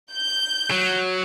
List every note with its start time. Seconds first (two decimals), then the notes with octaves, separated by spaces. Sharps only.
0.12 G6
0.71 F#3